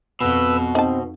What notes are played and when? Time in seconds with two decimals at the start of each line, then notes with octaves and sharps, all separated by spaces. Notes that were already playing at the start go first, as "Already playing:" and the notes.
0.21 F2 B2 B4 E6
0.75 C4 D#4 A5